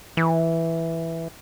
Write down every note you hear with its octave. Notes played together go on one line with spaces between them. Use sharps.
E3